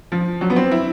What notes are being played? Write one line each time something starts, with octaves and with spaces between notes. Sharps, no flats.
F3
F#3
B3
C4
E4